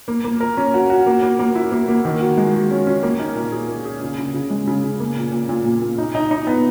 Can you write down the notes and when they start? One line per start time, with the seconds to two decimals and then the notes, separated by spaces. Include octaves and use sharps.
0.08 A#3
0.24 A#3
0.41 A#4
0.57 C#4
0.74 F#4
0.90 F#4
1.06 A#3
1.23 A#3
1.39 A#3
1.55 E4
1.72 A#3
1.88 A#3
2.05 D#3
2.21 F#4
2.38 G#3
2.54 F#4
2.71 C#4
2.87 C#4
3.03 A#3
3.19 D#4
3.36 A#2
3.52 G#4
3.69 A#3
3.85 G#4
4.02 C#3
4.18 C#3
4.34 C#3
4.50 G#3
4.67 C#3
4.84 C#3
5.00 A#3
5.16 A#2
5.32 A#2
5.49 A#2
5.66 A#2
5.82 A#2
5.98 D#4
6.15 D#4
6.31 D#4
6.47 B3